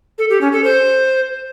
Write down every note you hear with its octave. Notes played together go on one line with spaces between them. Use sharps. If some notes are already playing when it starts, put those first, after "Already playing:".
A4
G4
C#4
A4
C5